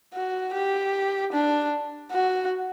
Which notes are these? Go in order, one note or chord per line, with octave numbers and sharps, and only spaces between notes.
F#4
G4
D4
F#4